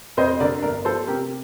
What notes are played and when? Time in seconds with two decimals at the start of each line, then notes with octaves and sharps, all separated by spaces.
0.17 F2 C5 D#5
0.40 D3 A#4 D5
0.62 G1 A#4 D5
0.85 F3 A4 C5
1.07 C3 G4 A#4